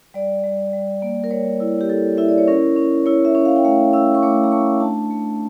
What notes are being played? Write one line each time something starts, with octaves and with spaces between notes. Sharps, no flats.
G3 D5
G3
G3
A#3
A#4
G3 C#5
E4
G4
E4 A4
E4 E5
D5
C#5
C#4 A#4
C#4
E4 C#5
E5
C#4
F5
G5
A3 F5
C#4 E6
C#6
A3 D6
A#5
A3 C#6
D4 A5
A3